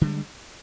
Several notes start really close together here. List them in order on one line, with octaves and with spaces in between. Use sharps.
D3 G3 G#3